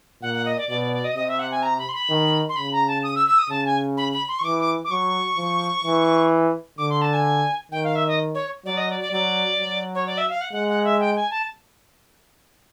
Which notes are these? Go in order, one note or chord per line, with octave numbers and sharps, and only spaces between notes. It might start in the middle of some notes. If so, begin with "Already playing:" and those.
A#2 F#5
F#5
D#5
D5
B2 D5
D5
D5
D#5
C3 D#5
E5
F#5
G#5
A#5
B5
C6
B5
D#3
C6
C#3 B5
A#5
A5
D#6
E6
E6
D#6
C#3 A5
G#5
B5
B5
C6
C#6
E3 D6
D6
D6
F#3 C#6
F3
E3
D3 D6
C6
A5
G#5
D#3 G5
F5
E5
D#5
C#5
F#3 D5
D#5
D5
D5
F#3 D5
F#3
C#5
D5
E5
F5
F#5
G#3 F#5
F#5
E5
G5
G#5
A5